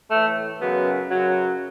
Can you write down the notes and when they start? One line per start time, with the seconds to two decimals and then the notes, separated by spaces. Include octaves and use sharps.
0.11 A2 E3 A3
0.61 F#2 C#3 F#3 B3
1.11 F#2 C#3 F#3